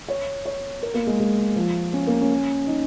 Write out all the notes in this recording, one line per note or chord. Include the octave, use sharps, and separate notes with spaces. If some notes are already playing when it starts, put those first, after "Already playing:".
C#5
C#5
A#4
A#3
G#3
G#3
F3
C#4
A#3
C#4
D#4